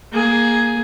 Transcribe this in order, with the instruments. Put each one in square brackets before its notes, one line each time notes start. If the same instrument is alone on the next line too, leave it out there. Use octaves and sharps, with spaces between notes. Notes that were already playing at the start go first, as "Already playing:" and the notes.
[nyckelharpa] A#3 G#4